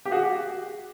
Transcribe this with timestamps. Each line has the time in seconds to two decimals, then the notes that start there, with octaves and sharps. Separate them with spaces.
0.05 G4
0.11 F#4 G#4